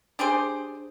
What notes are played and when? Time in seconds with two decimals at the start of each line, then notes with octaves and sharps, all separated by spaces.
0.19 D4 G4 G#4 C5